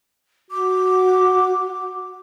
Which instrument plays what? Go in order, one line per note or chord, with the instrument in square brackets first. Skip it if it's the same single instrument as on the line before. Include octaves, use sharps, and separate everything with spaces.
[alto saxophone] F#4 [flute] D6